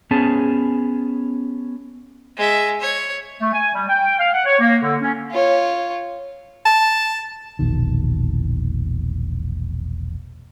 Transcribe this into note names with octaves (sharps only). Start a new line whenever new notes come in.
B3 C#4 G#4 A5
G#3 E5
C#5
A3
G#5
G3
G5
F5
F#5
C#5
A#3
D3
C#4
F4 C#5
A5
E1 A#1 B2 D#3